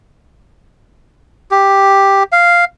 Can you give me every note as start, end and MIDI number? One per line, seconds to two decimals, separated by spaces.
1.51 2.23 67
2.32 2.65 77